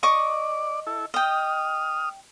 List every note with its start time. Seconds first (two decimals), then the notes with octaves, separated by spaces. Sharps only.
0.03 D5 D#5 C#6 D6
0.87 E4 A4
1.14 D#5 G5 D#6 F6